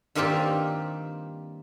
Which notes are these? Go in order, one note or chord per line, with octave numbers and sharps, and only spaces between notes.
G2 D#3 A#3 C4 F4 G4